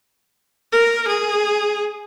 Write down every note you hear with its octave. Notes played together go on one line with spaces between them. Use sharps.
A#4
G#4